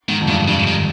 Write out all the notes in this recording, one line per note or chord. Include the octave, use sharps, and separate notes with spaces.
G#2 D#3
F2
G2 D#3
G2 C#3
D#3